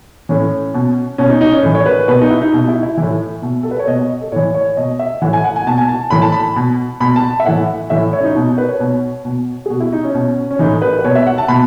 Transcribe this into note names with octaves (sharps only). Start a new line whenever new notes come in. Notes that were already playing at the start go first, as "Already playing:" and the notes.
A2 E3 C#4
B2
B2 C#4
D#4
D#4
C#4
A2 E3
C#5
B4
B2 B4
D#4
E4
D#4
B2 D#4
E4
E4
A2 E3 E4
B2
A4
B4
C#5
B2 D#5
D#5
A4
A2 E3 C#5
C#5
B2 D#5
E5
A2 E3 F#5
G#5
F#5
G#5
B2 A5
G#5
A5
A2 E3 B5
A5
B5
B2
B2 B5
A5
E5
A2 E3 F#5
A2 E3 E5
C#5
C#4
D#4
B2 D#4
B4
C#5
B2
B2
G#4
B2 F#4
E4
D#4
C#4
B2
C#4
A2 E3 D#4
B4
B4
B2 C#5
E5
F#5
A5
B2 B5